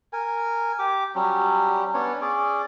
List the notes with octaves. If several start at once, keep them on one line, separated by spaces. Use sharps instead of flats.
A#4 G#5
G4 D6
F#3 G3 C#4
B3 C#4 D4 C#5
C#4 G#4 D5